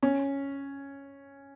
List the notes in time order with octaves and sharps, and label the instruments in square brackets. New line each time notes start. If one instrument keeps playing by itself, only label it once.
[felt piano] C#4